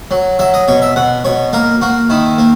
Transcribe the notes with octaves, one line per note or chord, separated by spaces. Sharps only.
F#3
F#3 E5
D#5
B2 C#5
E5
B2 F#5
B2 C#5
A#3 A#4
A#3 F#4
D#3 E4
A#3